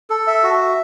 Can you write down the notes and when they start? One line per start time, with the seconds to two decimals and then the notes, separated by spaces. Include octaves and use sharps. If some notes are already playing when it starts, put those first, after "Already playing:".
0.10 A4
0.27 E5
0.44 F#4
0.61 E5